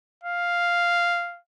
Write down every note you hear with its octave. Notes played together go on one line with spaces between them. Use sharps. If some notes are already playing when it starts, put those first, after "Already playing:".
F5